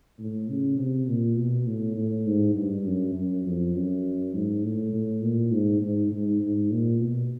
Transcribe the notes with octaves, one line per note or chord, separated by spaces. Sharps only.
A2
C#3
C3
A#2
B2
A2
A2
G#2
G2
F#2
F#2
F2
F#2
G#2
A2
A2
A#2
G#2
G#2
G#2
G#2
A#2
B2